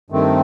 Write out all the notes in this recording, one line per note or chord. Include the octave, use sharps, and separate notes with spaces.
G2 D#3 A3 C4